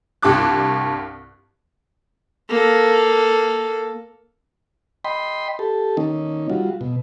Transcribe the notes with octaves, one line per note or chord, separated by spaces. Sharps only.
C2 G2 G4 A5 D6 F#6
A#3 A4
D#5 G5 B5 C6
G4 A4
D#3 A#3 C#4 D#4
G3 F4 F#4
B2